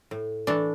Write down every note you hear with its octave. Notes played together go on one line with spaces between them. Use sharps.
A2
E3 A3 D4